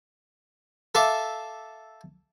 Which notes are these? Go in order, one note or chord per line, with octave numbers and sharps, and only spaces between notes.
A4 E5 F5 D6